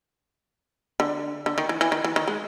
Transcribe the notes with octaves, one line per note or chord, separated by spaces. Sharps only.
D3
D3
D#3
E3
E3
D#3
E3
D#3
G#3